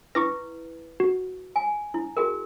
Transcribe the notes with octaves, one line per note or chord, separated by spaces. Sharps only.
E4 B4 C#6 D6 A#6
F#4
G#5
E4
F#4 G#4 A#4